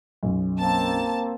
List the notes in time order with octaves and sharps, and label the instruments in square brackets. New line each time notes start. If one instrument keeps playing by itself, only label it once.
[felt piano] B1 F#2
[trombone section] A#3 C4 [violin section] A5